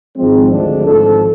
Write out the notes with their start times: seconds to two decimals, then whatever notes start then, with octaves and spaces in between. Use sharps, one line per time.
0.17 G#1 G#2 F3 G#3 C4
0.52 D2 D3 F3 G#3 D4
0.87 G#1 G#2 F3 A4